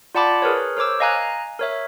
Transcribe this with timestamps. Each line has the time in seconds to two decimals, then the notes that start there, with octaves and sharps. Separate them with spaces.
0.15 F4 D5 F#5 A5 B5 D6
0.42 G#4 A#4 B4 C#5
0.77 A#4 C5 C#5 D6 E6
1.00 D#5 F5 G#5 A#5 F#6
1.59 A#4 C#5 E5